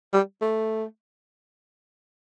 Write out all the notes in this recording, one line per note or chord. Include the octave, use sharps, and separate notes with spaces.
G3
A3